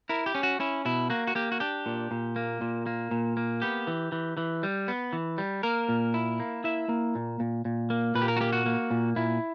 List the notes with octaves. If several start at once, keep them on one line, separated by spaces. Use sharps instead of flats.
E4 A#4
G4
C#4
F#4
C#4 E4
B2 E4
A#3 F#4
F#4
A#3 G4
F#4
D4 G4
A#2
A#2
A#3
A#2
A#3
A#2
A#3
B3 G4
E3
E3
E3
G3
B3
E3
G3
A#3 A#4
A#2
E4
A#3
E4 E5
A#3
A#2
A#2
A#2
A#3
A#2 B4
G4
A#4
F#4
A#3 G4
F#4
A#3
A#2
A#2 E4